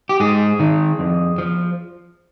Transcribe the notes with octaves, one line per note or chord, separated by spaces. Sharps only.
G4
G#2 G#4
D#3
F2
F3